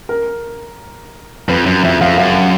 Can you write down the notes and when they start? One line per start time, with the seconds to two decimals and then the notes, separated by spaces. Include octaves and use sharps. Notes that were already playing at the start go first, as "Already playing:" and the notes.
0.09 A#4
1.48 F2 B4
1.66 F#2
1.83 F2 E5
2.01 F2 F5
2.18 F#2 F5